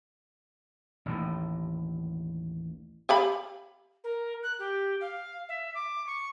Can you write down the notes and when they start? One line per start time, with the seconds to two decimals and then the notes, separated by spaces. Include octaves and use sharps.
1.06 A1 D#2 A2
3.09 G4 F5 B5
4.04 A#4
4.43 F#6
4.59 G4
5.01 F5
5.49 E5
5.75 D6
6.07 C#6